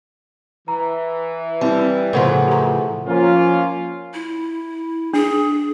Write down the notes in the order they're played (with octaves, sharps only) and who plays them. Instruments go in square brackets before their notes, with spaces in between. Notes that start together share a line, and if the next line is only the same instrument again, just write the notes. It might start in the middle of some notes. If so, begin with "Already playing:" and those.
[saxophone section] E3 [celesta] A#5
[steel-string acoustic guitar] G3 [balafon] C4 E4
[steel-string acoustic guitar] A2 C#3 F3 [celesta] A4 A#4 F#5
[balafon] G4 A#5
[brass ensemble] F3 A#3 C#4 F4
[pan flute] E4
[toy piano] D4 [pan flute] G#4